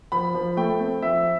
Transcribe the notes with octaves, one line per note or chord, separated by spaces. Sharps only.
F3 B5
F3
A3 G5
C4
F3 E5